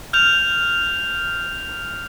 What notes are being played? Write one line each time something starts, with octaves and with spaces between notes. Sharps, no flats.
F6 G6 F7